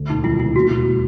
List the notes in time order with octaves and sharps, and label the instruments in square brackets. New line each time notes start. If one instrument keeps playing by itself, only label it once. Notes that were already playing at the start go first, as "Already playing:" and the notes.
Already playing: [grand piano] D2
[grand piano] E1 [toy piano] D#4
[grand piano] D#3 [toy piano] E4
[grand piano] C3 [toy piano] E4
[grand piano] D#2 [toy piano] F#4
[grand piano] E1